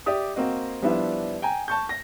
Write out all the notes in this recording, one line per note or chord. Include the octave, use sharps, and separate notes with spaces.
G4 D5 E5 D#6
A#3 C4 F#4 D#5
F3 G3 B3 D4 E4
G5 G#5 A#5
A5 C#6 G6
A#6